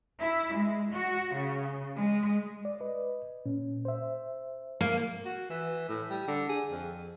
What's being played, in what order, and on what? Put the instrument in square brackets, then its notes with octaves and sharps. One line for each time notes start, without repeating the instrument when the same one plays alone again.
[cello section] E4
G#3
F#4
C#3
G#3
[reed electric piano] D5
B4 D#5
A#2 C#4
C5 E5
[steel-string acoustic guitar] A#3
[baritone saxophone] F#4
E3
A2
G3
D3
G#4
F2